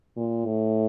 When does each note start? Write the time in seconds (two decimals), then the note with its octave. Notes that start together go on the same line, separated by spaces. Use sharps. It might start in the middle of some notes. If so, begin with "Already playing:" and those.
0.17 A#2
0.46 A2